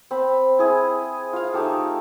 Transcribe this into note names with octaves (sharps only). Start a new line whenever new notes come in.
C4 B5
E4 G#4
F4 F5
A3 D#4 G4 A4